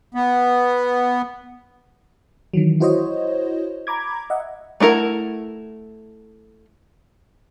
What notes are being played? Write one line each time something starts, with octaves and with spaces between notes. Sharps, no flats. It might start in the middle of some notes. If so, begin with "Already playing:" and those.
B3
D#3 E3 F#3
E4 F#4 C5 C#5 D#5
A#5 B5 D6 G#6
D#5 E5 F#5
A3 D4 E4 A#4 F#5